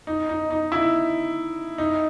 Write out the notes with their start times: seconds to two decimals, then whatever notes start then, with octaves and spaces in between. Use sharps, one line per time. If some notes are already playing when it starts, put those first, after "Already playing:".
0.07 D#4
0.29 D#4
0.51 D#4
0.72 E4
1.78 D#4